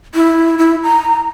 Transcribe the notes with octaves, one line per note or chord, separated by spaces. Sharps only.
E4
E4
A#5